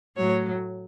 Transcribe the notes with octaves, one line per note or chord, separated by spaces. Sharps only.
A2 F#3 C#5